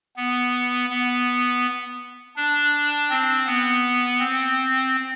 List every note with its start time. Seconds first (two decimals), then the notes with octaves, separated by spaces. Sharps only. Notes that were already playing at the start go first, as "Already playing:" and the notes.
0.17 B3
0.90 B3
2.36 D4
3.10 C4
3.46 B3
4.19 C4